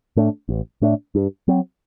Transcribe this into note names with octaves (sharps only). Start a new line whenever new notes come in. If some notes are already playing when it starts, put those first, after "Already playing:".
A2 A3 D4
A1
A2 A3 D4
G2
F#3 C4